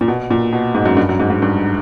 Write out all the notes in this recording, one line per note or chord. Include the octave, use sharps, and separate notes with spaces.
A#2
B2
A#2
B2
G#2
F#2
G2
F#2
G#2
G#2
G2